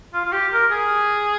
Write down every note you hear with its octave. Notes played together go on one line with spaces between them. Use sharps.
F4
F4
G4
A#4
G#4